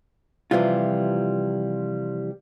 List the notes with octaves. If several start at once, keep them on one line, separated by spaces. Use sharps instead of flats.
C3 E3 F3 G3 F4